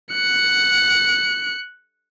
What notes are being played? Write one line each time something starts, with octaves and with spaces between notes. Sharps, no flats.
F#6 C#7